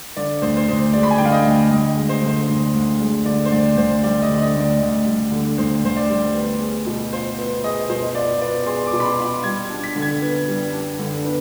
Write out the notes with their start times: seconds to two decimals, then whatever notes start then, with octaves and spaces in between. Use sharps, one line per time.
0.17 D3 D5
0.42 D2 C5
0.57 C5
0.68 D2 C5
0.93 G#3 D5
1.03 B5
1.11 G#5
1.18 D3 G5
1.25 F5
1.32 D#5
1.46 D2
1.71 D2 D#5
1.97 G#3
2.09 C5
2.23 D3
2.28 C5
2.49 D2
2.74 D2
3.00 G#3
3.26 D3 D5
3.45 C5
3.51 D2 D5
3.77 D2 C5
4.03 G3 D5
4.22 D#5
4.29 D3
4.42 D#5
4.55 D2
4.60 D5
4.80 D2
5.06 G3
5.31 D3
5.58 D2 C5
5.84 D2 C5
5.97 D5
6.09 G3
6.35 B3
6.60 G#4
6.86 B2
7.12 F4 C5
7.38 B3
7.64 G#4 D#5
7.90 B2 C5
8.15 F4 D5
8.41 B3 D5
8.66 G#4 C6
8.87 D6
8.93 B2
9.00 B5
9.05 C6
9.19 F4
9.25 D6
9.44 G3 G#6
9.70 D4
9.83 B6
9.96 D3
10.02 G#6
10.22 B3
10.48 G3
10.73 D4
10.99 D3
11.25 B3